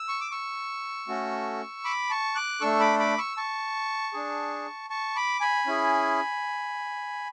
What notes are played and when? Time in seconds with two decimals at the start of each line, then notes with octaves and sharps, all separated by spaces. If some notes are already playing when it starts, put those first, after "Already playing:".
Already playing: E6
0.08 C#6
0.21 D6
0.31 C#6 E6
1.08 A3 C#4 F#4 A4
1.84 B5 D6
2.10 A5 C#6
2.35 D6 F#6
2.61 A3 D4 A4 C#6 E6
2.80 B5 D6
2.99 B5 D6
3.18 C#6 E6
3.37 A5 C#6
4.14 D4 G#4
4.90 A5 C#6
5.16 B5 D6
5.41 G#5 B5
5.67 C#4 E4 G#4